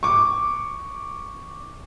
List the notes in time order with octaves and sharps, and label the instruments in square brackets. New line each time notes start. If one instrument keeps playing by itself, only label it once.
[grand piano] C#6 D6